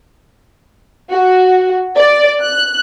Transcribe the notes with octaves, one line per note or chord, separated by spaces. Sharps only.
F#4
D5
F#6